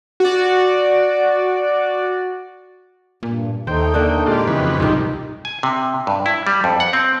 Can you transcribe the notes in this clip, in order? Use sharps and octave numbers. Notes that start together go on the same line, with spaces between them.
F#4 D5
G2 A#2
D#2 A3 D#4 C5 G5
D3 A#3 D4
A#2 G#3 D#4 F4 G4 D5
F2 C#3 E3 B4
C2 G#2 C3 D#3 F3 G3
G#5
C3
G2
E4
G3
F2
F#5
C4